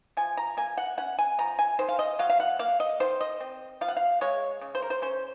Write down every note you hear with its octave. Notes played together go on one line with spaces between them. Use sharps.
F3 G#5
A#5
A#3 G#5
F#5
C#4 F#5
G#5
F3 A#5
G#5
D#3 C5
F5
D#5
F#3 F5
F5
F#5
A#3 F5
D#5
D#3 C5
D#5
C4
F3 F5
F#5
F5
G#3 C#5
C#3
C5
A#4
C5
C#4 C5